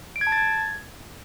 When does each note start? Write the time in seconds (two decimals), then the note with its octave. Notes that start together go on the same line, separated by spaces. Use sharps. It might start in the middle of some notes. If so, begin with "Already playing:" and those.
0.16 D7
0.21 G#6
0.27 A5
0.32 A6
0.38 G#6